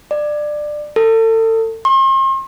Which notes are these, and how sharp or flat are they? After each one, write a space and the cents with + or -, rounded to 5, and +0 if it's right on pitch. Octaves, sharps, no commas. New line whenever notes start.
D5 +20
A4 +35
C6 +45